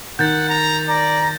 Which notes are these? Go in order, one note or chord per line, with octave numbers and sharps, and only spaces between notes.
D#3 F#5 G6 A6
A#5
D5 A#5